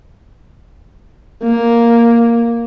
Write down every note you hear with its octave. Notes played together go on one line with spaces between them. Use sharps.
A#3